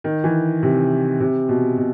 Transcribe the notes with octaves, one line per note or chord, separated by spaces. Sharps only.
D#3
E3
C3
C3
B2
B2